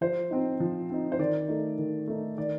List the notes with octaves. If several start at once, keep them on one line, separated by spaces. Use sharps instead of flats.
F3 C5
C4 D#4
F3
C4 D#4
C5
D#3 D5
A3 D#4
D#3
A3 D#4
D#3 D5